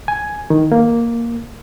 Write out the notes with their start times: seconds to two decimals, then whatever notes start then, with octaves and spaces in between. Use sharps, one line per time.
0.08 G#5
0.50 D#3
0.72 A#3